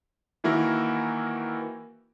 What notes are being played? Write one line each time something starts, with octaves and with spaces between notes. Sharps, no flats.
D#3 E3 A#3 E4 F#4 A#4